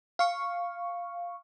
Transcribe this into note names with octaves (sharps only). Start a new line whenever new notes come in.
F5 C#6